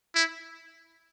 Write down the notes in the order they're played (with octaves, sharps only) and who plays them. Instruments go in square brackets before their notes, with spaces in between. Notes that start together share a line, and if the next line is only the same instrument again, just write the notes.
[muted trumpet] E4